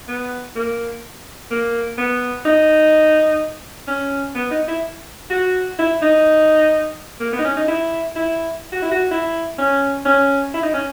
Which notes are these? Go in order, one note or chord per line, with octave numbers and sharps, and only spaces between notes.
B3
A#3
A#3
B3
D#4
C#4
B3
D#4
E4
F#4
E4
D#4
A#3
B3
D#4
C#4
D#4
E4
E4
F#4
E4
F#4
E4
C#4
C#4
E4
D#4
C#4